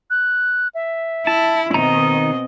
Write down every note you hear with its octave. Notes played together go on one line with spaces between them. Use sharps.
F#6
E5
E4 A5
B2 D#3 C4 D#4 D#5 A#5